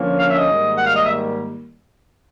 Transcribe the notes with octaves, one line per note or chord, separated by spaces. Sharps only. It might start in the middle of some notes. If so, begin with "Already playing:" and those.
Already playing: D3 F3 A#3 C#4
F5
E5
D#5
G#2 D#3 G3 A#3
F#5
F5
D#5
E5